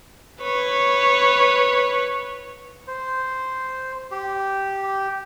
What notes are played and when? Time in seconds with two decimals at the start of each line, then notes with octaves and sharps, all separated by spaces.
0.42 B4 C#5
2.88 C5
4.11 G4